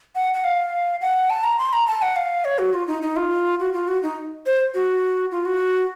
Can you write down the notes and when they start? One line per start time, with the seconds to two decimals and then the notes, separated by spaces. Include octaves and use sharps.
0.15 F#5
0.34 F#5
0.44 F5
1.01 F#5
1.30 A5
1.44 A#5
1.59 C6
1.73 A#5
1.87 A5
2.02 F#5
2.16 F5
2.45 C#5
2.59 F#4
2.73 F4
2.87 D#4
3.02 D#4
3.16 F4
3.60 F#4
3.74 F4
3.88 F#4
4.03 D#4
4.46 C5
4.74 F#4
5.31 F4
5.45 F#4